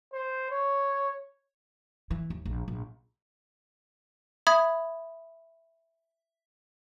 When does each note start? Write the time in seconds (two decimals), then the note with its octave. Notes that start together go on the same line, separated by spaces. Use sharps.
0.13 C5
0.51 C#5
2.11 E3
2.30 D#2
2.45 A#1
2.68 A#1
4.47 E5 B5 D#6 G#6